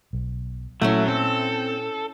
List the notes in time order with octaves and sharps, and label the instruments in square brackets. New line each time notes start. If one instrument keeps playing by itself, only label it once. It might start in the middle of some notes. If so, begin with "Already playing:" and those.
[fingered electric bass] B1
[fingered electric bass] A#2 [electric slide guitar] F#3 [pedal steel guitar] A3 [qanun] C#4 E4 F#5
[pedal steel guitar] C4 [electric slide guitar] A4